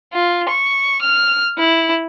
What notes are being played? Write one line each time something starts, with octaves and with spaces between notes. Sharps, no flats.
F4
C#6
F6
E4